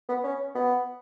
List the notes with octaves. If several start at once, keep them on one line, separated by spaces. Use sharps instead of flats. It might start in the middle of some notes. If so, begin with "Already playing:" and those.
B3
C#4
B3